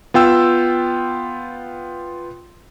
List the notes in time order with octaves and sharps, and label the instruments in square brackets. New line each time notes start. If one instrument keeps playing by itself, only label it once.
[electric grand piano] B3 F4 G5 E6